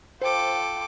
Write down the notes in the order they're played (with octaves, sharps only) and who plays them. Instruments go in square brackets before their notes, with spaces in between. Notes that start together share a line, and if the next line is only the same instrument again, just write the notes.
[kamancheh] F4 G5 [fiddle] A4 D6 [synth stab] C5